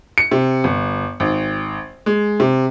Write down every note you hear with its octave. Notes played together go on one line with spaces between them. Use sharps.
C#7
C3
G1
G#1
G#3
C3